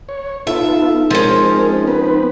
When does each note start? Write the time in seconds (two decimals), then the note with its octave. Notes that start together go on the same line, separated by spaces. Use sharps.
0.09 C#5
0.47 B3 D#4 F4 A4 E5
1.10 F3 G#3 C4 C#4 D#4 A#4
1.87 B3 C4 D#4 B4